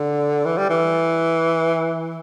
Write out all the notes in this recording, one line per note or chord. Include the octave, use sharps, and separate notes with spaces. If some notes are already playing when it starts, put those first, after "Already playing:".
Already playing: D3
E3
G3
E3